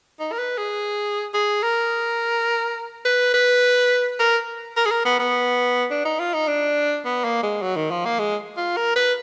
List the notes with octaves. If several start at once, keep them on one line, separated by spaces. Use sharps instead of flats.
D#4
A#4
B4
G#4
G#4
A#4
B4
B4
A#4
A#4
G#4
A#4
B3
B3
D4
D#4
F4
D#4
D4
B3
A#3
G#3
F#3
D#3
F3
A#3
G#3
F4
A#4
B4